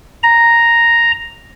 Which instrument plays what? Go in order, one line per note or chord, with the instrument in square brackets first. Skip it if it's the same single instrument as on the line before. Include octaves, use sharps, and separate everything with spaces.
[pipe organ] A#5